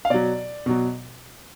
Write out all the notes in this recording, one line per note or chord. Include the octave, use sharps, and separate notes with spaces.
F5
B2 F#3 D5
B2 F#3